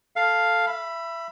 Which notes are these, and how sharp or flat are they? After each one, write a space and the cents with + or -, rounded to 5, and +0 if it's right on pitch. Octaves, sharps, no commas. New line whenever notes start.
A4 +0 F5 +0
E5 +25 B5 +0